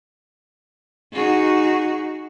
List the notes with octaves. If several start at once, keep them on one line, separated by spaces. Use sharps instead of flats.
D#4 F#4 G#4